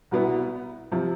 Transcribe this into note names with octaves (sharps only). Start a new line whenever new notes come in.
C2 B2 B3 E4
C3 F3